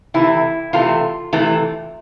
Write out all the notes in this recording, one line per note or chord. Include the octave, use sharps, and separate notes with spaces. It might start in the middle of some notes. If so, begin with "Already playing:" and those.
C3 E3 A3 E4
C3 E3 A3 F4
C3 E3 A3